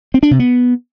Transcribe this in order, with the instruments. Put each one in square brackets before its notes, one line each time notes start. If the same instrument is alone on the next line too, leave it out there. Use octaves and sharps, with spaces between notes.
[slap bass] C4
D4
C3
B3